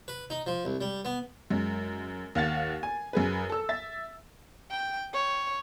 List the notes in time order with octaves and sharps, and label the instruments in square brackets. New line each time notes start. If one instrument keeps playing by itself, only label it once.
[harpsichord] B4
D#4
F3
C2
G3
B3
[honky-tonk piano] F#2 G#3
D#2 F5 F#5 A6
G#5
F#2 G#4 B4
A4 E6
E5 A6
[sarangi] G5
C#5